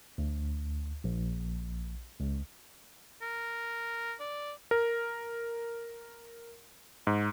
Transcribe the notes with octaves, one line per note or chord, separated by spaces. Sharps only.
D2
A#1
C#2
A#4
D5
A#4
G#2